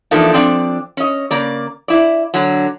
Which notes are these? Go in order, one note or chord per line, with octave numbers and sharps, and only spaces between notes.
E3 F3 A3 A#3 D4 D#4
F3 C4 D4 D5
C#4 D#5
C#3 A#3 D5
E4 D5
D3 F#3